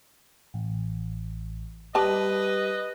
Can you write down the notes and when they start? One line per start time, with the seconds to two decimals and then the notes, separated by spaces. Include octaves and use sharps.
0.54 A1
1.95 G3 G4 B4 D#5 A5